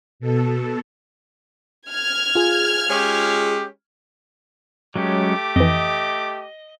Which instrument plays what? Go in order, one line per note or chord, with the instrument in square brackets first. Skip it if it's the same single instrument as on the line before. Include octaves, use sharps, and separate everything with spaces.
[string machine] B2 A4
[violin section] F6 G#6
[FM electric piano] F4 G#4
[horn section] G#3 C#4 G4
[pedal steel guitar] F#3 G#3 C#4 [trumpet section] A3 G4 D6
[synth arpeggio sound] F2 E3 [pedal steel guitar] D#5